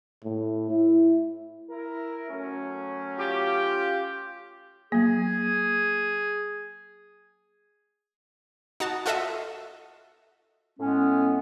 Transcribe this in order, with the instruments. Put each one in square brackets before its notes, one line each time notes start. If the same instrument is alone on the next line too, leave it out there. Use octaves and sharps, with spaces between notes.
[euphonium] A2
E4
[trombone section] E4 A#4
F#3 A3 C#4
[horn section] F4 G4
[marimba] F#3 A#3 [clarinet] G#4
[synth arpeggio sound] D#4 F#4 A5
F4 F#4 A4 D#5 E5
[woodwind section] A2 G#3 B3 C#4